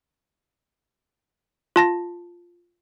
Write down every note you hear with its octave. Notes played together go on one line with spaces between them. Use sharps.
F4 A5 A#6